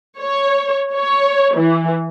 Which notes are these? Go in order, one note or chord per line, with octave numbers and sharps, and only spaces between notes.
C#5
C#5
E3